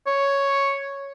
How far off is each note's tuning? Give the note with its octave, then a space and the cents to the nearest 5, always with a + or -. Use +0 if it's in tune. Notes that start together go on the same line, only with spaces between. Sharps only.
C#5 +0